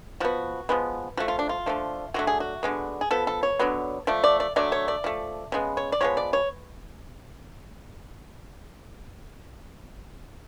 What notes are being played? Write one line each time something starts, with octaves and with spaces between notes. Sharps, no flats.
F3 B3 F#4
F3 G#3 B3
F3 A3 F#4
F4
D4
F4
D3 F3 A3
D3 F#3 A3 F#4
G#4
F#4
D3 G#3 B3
G#4
F3 B3 A4
A4
C#5
D3 F#3 B3
F3 A3 D5
D5
D5
D3 F#3 A3 D5
C#5
D5
F3 A3
C#3 G#3 B3
C#5
D5
F3 G#3 B3 C#5
D5
C#5